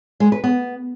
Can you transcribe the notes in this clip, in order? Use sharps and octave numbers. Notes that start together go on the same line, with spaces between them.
G#3
B4
B3